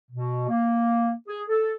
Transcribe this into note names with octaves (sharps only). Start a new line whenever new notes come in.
B2
A#3
G#4
A4